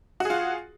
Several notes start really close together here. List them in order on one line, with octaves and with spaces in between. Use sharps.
F#4 G#4 F4